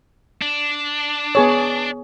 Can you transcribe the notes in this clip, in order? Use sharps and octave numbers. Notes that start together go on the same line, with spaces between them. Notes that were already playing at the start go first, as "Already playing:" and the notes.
D4
B3 G#4 C#5